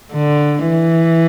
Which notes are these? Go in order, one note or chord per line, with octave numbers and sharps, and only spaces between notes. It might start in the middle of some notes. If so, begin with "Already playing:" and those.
D3
E3